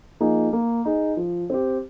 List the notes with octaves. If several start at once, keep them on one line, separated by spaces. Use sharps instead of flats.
F3 A#3 D#4 G#4
A#3
D#4 G#4
F3
C4 G4